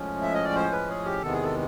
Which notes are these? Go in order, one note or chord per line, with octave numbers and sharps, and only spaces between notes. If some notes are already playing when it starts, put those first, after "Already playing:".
Already playing: A2 F3 G#3 C#4
E5
D#5
D5
C5
B4
G#4
G4
E2 C3 D#3 G#3 B3 A4
G#4
A4